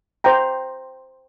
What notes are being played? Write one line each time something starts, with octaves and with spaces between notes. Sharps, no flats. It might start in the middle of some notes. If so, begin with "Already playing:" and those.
C5 G5 A#5